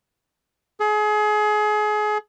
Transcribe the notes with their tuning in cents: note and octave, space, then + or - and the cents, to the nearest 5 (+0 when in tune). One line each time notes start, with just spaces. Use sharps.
G#4 +30